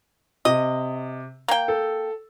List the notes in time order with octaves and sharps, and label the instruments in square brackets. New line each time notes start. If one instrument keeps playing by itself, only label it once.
[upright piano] C3 [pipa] D#5
[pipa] A#3 G5
[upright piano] A4